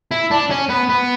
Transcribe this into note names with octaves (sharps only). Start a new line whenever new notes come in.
E4
D4
C#4
B3
B3